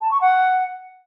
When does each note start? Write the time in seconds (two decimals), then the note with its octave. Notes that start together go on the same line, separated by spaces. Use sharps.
0.01 A5
0.11 C#6
0.21 F#5